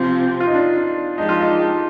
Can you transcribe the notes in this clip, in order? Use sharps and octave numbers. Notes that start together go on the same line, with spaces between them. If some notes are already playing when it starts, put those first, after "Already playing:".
Already playing: C3 F3 C4 F4
F4
D#4
D4
F3 G#3 D4 D#4 G4
F4
D#4